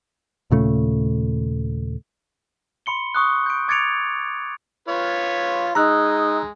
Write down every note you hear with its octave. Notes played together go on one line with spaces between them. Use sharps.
D#2 A#2 C#3 A3
B5 C6 C#7 G7
C#6 D#6 F#6
G6 D7
D6 G#6 A6 C#7 D7 F7
F4 B4 C#5
G#3 D#4 A#5 E6 F#6